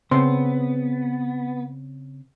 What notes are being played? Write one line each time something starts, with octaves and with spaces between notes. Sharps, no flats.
C#3 B3 C4 C6